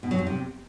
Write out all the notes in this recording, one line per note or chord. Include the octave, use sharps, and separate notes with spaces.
B2
F#3
F2
C3